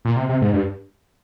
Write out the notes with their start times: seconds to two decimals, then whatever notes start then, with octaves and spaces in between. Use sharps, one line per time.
0.05 A#2
0.16 C3
0.29 C3
0.42 G#2
0.54 G2